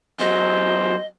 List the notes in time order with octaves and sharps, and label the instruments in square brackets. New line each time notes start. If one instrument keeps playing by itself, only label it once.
[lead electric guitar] E2 F#3 [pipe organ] C5 [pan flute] D#5